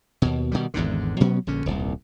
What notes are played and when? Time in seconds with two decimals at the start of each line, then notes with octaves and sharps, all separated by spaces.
0.22 D#2 B2
0.52 B2 D#3 G3
0.74 G#1 E2 G#2 D3
1.20 B2 F#3 B3 C#4
1.47 A#1 D3 C#4
1.66 D#1 C2